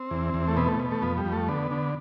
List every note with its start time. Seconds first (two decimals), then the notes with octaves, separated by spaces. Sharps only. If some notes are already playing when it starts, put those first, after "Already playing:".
Already playing: C4
0.11 E2
0.34 E2
0.48 A3
0.57 B2 B3
0.68 A3
0.79 B2
0.91 A3
1.02 F2 B3
1.18 G3
1.25 F2
1.32 A3
1.48 D3 B3
1.71 D3